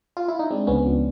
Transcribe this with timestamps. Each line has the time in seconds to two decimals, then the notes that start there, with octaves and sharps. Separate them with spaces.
0.17 F4
0.28 E4
0.39 D#4
0.51 G#3 C4 D4
0.67 C#2 B3 C#4
0.85 F3